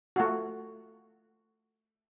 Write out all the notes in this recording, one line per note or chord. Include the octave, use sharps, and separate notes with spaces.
A3 F4 F#4